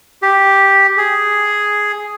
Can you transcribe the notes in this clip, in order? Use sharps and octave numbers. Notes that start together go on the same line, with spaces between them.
G4
G#4